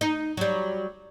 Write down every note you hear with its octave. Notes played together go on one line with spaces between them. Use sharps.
D#4
F#3 G3